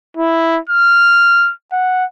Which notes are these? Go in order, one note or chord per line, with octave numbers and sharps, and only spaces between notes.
E4
F6
F#5